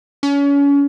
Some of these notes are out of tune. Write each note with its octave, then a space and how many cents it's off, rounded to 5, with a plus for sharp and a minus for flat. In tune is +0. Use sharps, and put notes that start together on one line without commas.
C#4 +35